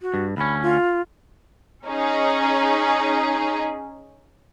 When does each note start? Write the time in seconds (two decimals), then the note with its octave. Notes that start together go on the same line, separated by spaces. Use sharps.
0.02 F#4
0.14 G2
0.37 D2 C#4 B5
0.63 F4
1.86 C#4 D#4 G#4